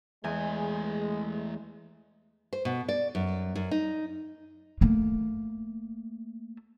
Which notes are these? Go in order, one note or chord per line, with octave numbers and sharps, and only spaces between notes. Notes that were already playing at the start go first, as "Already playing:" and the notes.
E2 G#3 A3 G#5
C5
B2
D5
F#2
F#2
D#4
A3 A#3